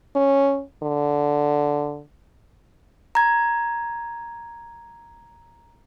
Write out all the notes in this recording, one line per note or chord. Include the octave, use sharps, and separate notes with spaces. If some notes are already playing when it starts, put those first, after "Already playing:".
C#4
D3
A#5 G#6